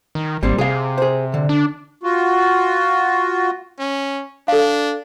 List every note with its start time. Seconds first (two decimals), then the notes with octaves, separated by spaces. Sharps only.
0.15 D#3
0.43 G#1 G3 A#3 C4
0.59 C3 G#4 F5
0.98 G#4 C5
1.34 D3
1.49 D4
2.03 F4 F#4
3.79 C#4
4.48 D4 A4 F5